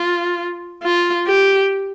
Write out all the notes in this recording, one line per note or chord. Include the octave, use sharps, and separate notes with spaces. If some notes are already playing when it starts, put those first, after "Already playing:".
Already playing: F4
F4
G4